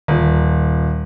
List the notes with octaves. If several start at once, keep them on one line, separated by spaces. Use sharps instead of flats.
D#1